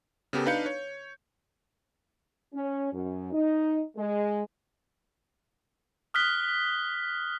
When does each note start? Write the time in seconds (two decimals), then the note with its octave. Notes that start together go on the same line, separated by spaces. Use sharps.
0.33 C#3 B3 G4 A4 A#4
0.46 D4 D#4 B4 F5 G6 C#7
0.66 C#5
2.54 C#4
2.92 F#2
3.32 D#4
3.96 G#3
6.14 D#6 F6 F#6 B6 G7